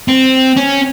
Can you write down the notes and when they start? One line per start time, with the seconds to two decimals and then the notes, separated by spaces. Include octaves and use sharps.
0.08 C4
0.57 C#4